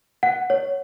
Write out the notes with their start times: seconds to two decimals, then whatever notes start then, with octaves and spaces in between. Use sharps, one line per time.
0.23 F#5
0.50 C#5